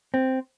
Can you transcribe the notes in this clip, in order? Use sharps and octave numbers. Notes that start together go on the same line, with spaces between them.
C4